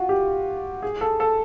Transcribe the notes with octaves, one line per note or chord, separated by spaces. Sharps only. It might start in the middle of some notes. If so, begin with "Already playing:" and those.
Already playing: F4 F#4
G4
G#4
A4
A4